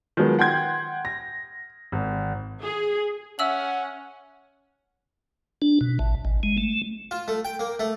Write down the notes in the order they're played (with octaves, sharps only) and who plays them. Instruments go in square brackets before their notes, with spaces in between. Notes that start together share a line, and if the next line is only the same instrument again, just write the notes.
[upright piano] D#3 F3 F#3 G#3 B3
F#5 G5 C6 G6 G#6
A#6
G#1
[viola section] G#4
[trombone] C#4 [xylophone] E5 E6 F#7 [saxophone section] F#5
[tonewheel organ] D4
B2
A1
G#1
G#3
A3
[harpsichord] F4
A3
G5
A#3
A3